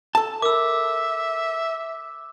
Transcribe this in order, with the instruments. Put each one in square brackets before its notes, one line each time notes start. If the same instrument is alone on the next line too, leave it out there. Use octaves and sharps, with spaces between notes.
[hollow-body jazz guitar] A4 A5
[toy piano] A#4 B5 [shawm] E5 [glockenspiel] D6 E6